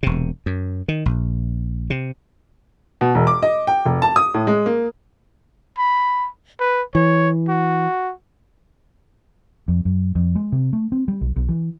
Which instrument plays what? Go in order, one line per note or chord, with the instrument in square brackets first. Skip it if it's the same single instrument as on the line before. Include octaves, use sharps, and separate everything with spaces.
[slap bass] E1 C3
F#2
D#3
A#1
C3
[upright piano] B2
E1
D6
D#5
G5
F1
A5
D#6
A2
G#3
A#3
[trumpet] B5
B4
[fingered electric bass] E3 [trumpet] C#5
[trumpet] F#4
[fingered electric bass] F2
F#2
F2
G#3
C3
A3
C4
G3
B1
B1
E3